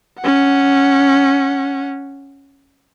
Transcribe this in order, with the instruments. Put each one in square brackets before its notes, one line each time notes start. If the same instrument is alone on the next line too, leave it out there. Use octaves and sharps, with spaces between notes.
[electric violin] C#4 F#5